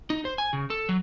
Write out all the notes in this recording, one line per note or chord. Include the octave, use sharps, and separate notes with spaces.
D#4
C5
G#5
C#3
A4
F#3